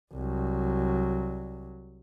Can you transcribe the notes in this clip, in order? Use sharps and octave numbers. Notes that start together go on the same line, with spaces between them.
C2 F#3